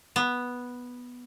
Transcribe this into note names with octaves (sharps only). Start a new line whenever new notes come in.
B3